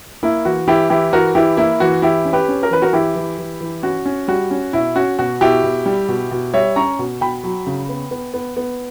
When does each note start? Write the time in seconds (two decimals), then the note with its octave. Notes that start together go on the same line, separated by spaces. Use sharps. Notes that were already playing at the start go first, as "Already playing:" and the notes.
0.23 A#3 E4
0.45 E3 F#4
0.67 E3 E4 G4
0.90 E3 E4 G4
1.13 E3 F#4 A#4
1.35 E3 E4 G4
1.57 A#3 E4
1.80 E3 F#4
2.02 E3 E4 G4
2.25 C#4
2.33 G4 B4
2.48 C#4
2.63 A#4
2.70 E3 B4
2.82 F#4 A#4
2.93 E3 E4 G4
3.15 E3
3.38 E3
3.61 E3
3.83 C#4 F#4
4.05 C#4
4.28 G3 F#4
4.51 C#4
4.73 B2 E4
4.96 C#4 F#4
5.19 B2 F#4
5.41 B2 E4 G4
5.64 B2
5.86 G3
6.08 B2
6.31 B2
6.54 G3 C#5 E5
6.76 C#4 A#5 C#6
6.99 B2
7.21 B2 G5 B5
7.43 F#3
7.67 C#3
7.89 B3
8.11 B3
8.34 B3
8.57 B3